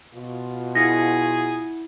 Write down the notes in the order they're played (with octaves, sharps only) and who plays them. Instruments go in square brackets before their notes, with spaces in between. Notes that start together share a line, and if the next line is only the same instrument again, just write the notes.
[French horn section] B2 F4
[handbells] E4 F#5 [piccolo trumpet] G#4 [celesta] A#6